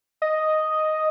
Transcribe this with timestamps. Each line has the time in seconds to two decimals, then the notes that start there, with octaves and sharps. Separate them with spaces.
0.22 D#5